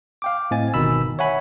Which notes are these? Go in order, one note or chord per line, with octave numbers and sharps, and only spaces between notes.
F5 G5 D6
A2 C4 D#5 G#5 A6
G1 B2 D#3 D#4 B5 E6
C#5 E5 F#5 G#5 B5